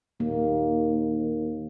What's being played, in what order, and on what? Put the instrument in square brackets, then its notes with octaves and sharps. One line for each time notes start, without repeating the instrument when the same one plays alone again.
[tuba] D#2 [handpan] A#3